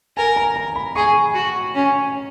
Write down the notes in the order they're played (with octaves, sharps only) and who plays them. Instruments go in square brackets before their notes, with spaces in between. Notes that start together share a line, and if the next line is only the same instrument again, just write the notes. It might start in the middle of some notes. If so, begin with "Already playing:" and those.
[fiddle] A#4 [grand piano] G#5
[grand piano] A#5
A#5
B5
[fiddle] G#4 [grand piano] C#6
[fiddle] F#4
C#4